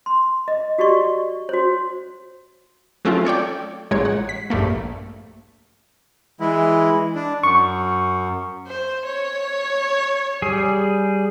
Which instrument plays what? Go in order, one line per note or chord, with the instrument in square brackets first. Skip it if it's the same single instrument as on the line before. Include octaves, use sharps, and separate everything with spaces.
[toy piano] C6
D#5
F#4 G4 D5 D#5 C#6
F#4 C5 C#5
[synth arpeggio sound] F#3 A3 C4 C#4 F4
A4 C#5 D5 G5
A1 A#2 G#3 C#5 G#6
F#5
B6
A#1 G2 G3 A3 A#3
[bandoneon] E3 G#3 E4
D4
[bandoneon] F#2 [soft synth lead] C#6
[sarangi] C5
C#5
[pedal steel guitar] G3 G#4